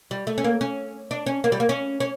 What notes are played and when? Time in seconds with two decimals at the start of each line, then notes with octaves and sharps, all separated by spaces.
0.11 G3
0.27 A3
0.38 C#4
0.44 A#3
0.61 C#4
1.11 D4
1.26 C#4
1.44 A#3
1.52 G3
1.60 A#3
1.69 C#4
2.00 C#4